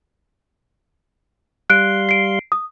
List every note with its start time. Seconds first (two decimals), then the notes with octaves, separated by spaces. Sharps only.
1.70 G3 F5 C6 F#6 D7
2.09 C7 D7
2.52 D#6